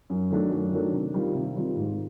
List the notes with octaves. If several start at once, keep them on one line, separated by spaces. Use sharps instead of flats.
F#2
D#3 F#3 A3 D4
F#2
D#3 F#3 A3 D4
C3
D#3 G3 C4 F4
C3
D#3 G3 C4 F4
G#2